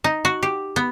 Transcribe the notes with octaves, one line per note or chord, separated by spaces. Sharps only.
D#4
F#4
G4
B3